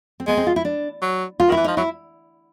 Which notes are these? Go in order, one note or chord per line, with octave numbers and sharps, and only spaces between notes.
C4
G#3 B3
C4
F4
E4
D4
F#3
F4
D#3 E4
E3
F3 D#4
F#3 E4